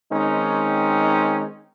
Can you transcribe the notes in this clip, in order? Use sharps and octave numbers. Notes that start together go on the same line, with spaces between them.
D#3 G#3 C4 C#4 D#4